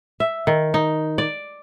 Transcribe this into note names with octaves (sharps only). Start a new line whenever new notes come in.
E5
D#3
D#4
D5